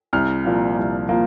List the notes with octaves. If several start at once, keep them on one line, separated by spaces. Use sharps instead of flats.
C2 F6
A#2 F3 A#3
C2
F3 A#3